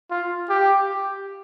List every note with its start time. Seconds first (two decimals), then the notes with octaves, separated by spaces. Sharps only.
0.10 F4
0.49 G4